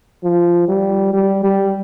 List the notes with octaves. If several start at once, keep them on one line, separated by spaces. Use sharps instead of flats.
F3
G3
G3
G3